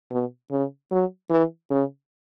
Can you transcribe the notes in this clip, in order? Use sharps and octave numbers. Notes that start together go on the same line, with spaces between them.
B2
C#3
F#3
E3
C#3